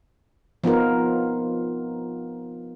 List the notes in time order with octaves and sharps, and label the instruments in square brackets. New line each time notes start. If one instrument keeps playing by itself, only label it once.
[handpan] F3 B3 D#4 F4 A#4